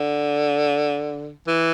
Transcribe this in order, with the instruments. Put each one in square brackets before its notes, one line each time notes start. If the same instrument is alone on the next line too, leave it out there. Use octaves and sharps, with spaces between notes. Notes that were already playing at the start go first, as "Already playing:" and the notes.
Already playing: [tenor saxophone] D3
E3